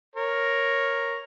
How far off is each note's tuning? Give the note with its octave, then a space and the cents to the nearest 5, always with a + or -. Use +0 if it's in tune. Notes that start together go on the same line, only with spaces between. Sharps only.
A#4 +0 C#5 -10